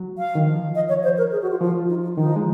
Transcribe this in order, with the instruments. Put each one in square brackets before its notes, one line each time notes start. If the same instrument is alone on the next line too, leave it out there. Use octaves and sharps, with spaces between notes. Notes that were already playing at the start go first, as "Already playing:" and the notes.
Already playing: [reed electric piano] F#3
[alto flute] F5
[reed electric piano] D#3
F3
[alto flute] D#5
C#5
C5
A#4
G#4
F#4
F4
[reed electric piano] F3 [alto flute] F4
[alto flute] D#4
F4
[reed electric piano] D#3 [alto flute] D#4
[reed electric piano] F3
G#3